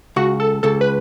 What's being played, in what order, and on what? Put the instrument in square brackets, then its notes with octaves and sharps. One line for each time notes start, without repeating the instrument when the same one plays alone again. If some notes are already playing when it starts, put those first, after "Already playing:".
[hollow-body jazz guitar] C#2 [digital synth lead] F#4
[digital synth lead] A4
[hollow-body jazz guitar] C#2 [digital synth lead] A4
[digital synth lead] B4